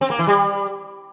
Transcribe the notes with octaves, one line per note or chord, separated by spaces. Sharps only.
C4
A#3
E3
G3